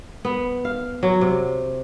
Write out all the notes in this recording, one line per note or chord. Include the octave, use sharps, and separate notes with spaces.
B3
F5
F#3
C3